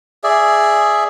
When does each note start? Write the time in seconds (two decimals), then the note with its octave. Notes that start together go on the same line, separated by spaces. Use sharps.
0.24 G#4 D5 E5